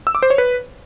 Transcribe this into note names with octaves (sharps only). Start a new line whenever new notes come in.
E6
D6
C5
C#5
B4